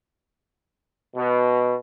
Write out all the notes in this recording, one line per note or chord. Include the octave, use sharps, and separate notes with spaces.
B2